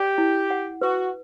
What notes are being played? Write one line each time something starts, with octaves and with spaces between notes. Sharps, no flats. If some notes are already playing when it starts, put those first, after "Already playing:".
Already playing: G4 D5
E4
F#5
F#4 B4